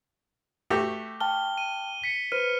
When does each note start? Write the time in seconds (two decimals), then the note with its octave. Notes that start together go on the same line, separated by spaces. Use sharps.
0.70 A3 F#4 G4 E6
1.20 G5 A5 F6 G7
1.58 D#7
2.04 B6 C#7
2.32 B4 C5 F6 D#7